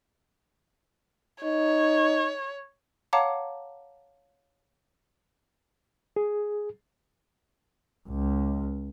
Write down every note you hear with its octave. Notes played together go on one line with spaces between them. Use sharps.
D#4 C#5
C#5 F5 F#5 A5 A#5 D6
G#4
C#2